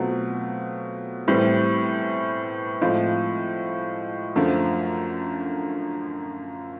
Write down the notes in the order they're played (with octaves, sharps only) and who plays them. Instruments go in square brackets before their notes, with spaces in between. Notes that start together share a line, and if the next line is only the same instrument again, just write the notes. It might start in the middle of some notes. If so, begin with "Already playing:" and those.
Already playing: [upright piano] B2 F#3 A3 C4 F4
A2 E3 G3 C4
A2 F3 G#3 C4 F4
F#2 D3 F3 A3